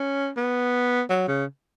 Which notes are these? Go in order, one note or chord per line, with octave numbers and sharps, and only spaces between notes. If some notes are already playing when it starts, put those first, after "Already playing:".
Already playing: C#4
B3
F#3
C#3